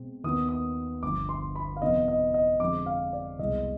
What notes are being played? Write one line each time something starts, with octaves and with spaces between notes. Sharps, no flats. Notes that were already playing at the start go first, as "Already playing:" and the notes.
Already playing: B2 G#3 C4
D#2 D#3 B3 D#4 D#6
D#6
G1 G2 F3 D6
C6
B5
F5
F2 C3 D#3 B3 D#5
D#5
D#5
F2 D3 F3 G#3 C4 D6
F5
D5
C2 B2 G#3 D#5